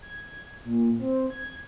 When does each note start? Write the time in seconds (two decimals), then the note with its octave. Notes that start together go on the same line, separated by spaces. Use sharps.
0.02 G#6
0.64 A#2
0.99 C4
1.30 G#6